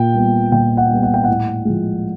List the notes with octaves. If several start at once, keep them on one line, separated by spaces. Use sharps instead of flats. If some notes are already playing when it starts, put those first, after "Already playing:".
Already playing: A#2 G5
G3 B3
A#2 G5
F#5
G3 B3
F#5
G5
A2 F#5
F3 G#3